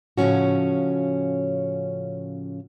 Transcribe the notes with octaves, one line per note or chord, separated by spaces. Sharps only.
A2 C#3 F3 C#4 F#4